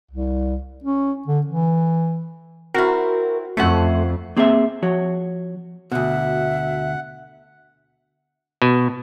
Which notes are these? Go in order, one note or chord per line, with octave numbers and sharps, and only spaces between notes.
C2
C#4
D3
E3
C4 E4 F#4 A#4
F2 A3 C#4 C5 F#5
A#3 C4 G#4 C5 D5 E5
F3 F#4 C#5
D2 B2 E5 F#5
B2